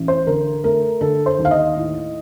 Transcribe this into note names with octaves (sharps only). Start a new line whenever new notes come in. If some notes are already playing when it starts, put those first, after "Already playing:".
Already playing: A1
C5
D3 A#4
A3 A#4
D3 A4
C5
D#2
F5
D#5
A2